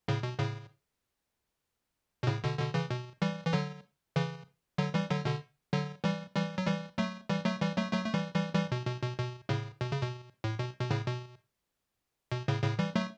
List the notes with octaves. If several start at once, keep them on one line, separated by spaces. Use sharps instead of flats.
A2 C#3
B2
A2 C#3
B2
A2 C#3
B2 D3
B2 D3
C#3 E3
B2
E3 G3
E3
D3 F#3
C#3 E3
D3 F#3
E3 G3
D3 F#3
B2 D3
D3 F#3
E3 G3
E3 G3
F#3
E3 G3
F#3 A3
E3 G3
F#3 A3
E3 G3
F#3 A3
F#3 A3
A3
E3 G3
E3 G3
E3 G3
B2
B2
B2
B2
A2 C#3
B2
C#3
B2
A2
B2
B2
A2 C#3
B2
B2
A2 C#3
A2 C#3
E3 G3
F#3 A3